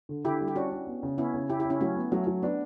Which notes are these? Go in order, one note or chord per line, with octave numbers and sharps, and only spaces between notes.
D3
D3 E4 G4
G3
G4
C#4 D4 F#4
C#4
B3
C#3
B3 C#4 E4
C#3
C#3 E4 G4
E4 G4
C#3
C#4 E4
F#3 A3 C#4
B3
F#3 A3 C#4
F#3
B3 D4